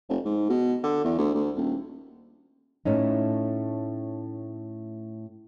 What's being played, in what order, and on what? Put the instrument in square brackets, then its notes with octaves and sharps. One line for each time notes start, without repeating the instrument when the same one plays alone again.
[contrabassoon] F1
G#2
B2
D3
E2
D2
D2
D#1
[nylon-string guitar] A2 A3 C#4 D#4